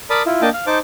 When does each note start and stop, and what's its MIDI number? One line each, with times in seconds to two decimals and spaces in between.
0.10 0.23 70
0.10 0.23 74
0.10 0.23 81
0.10 0.23 83
0.10 0.23 87
0.26 0.42 64
0.26 0.42 65
0.42 0.50 58
0.42 0.50 62
0.42 0.50 75
0.42 0.50 79
0.42 0.50 81
0.54 0.66 77
0.67 0.79 63
0.67 0.79 72
0.67 0.79 81
0.67 0.79 86